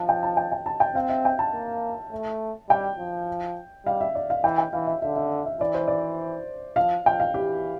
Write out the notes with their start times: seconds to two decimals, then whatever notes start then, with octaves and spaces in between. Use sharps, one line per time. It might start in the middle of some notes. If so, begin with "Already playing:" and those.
Already playing: F3 A5
0.09 G5
0.23 A5
0.37 G5
0.52 G5
0.66 A5
0.80 G5
0.95 C4 F5
1.09 E5
1.25 G5
1.39 A5
1.53 A#3
2.12 A3
2.69 G3 G5
2.99 F3
3.86 G3 F5
4.01 E5
4.15 D5
4.30 F5
4.44 E3 G5
4.58 G5
4.73 E3 F5
4.87 E5
5.02 D3 E5
5.16 E5
5.46 E5
5.61 E3 D5
5.74 C5
5.88 D5
6.76 F3 F5
7.05 F3 G5
7.20 F5
7.34 E3 G4